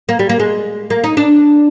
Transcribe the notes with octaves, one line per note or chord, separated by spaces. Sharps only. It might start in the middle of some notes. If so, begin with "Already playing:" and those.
A#3
G3
A#3
G#3
A#3
D#4
D4